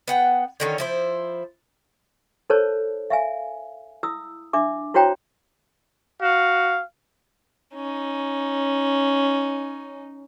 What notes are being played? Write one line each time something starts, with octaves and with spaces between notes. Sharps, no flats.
B3 F#5 G5
D3 D#3 C#4
F3 E4 C5
D#4 A4 A#4 C5 C#5 A5
E5 F5 G#5
E4 D#6 E6
D4 E5 D6
E4 F#4 C5 C#5 G5 A#5
F#4 F5
C#4 D#4